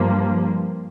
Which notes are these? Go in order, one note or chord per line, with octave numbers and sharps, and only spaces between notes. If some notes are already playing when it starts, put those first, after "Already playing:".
Already playing: G2 F3 A#3